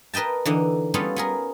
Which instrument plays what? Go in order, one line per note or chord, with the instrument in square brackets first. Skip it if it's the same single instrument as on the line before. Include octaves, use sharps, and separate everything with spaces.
[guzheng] A#4 B4 D#5 G5 A5
D3 E3 D#4
G3 B3 C#4 F4 G#4 A4
B3 G#4 A#4